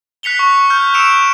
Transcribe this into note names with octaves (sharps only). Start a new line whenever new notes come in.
F#6 B6 C#7 F7 G7
C#6
F6 G6
E6 C#7 D7 E7 F7